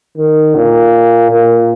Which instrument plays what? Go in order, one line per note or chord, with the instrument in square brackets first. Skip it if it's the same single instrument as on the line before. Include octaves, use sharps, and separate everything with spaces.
[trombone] D#3
A#2
A#2